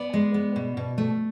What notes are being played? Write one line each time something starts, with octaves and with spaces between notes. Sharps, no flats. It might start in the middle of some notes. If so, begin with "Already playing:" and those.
Already playing: B3 D5
G#3
B3
B2
B2
A3